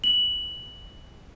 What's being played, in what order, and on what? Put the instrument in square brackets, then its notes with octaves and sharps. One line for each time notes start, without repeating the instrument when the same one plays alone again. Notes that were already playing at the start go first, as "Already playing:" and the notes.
[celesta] F#7